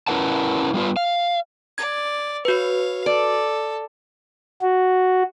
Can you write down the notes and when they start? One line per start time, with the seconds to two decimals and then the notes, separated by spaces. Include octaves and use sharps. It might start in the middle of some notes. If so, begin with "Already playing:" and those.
0.07 C#4 E4 A#4 B4 F#5 A5
0.74 G3 B3 F4 B4
0.96 F5
1.78 D5 G#6
2.45 F#4 B4 C#5 F5
3.06 A4 D5
4.61 F#4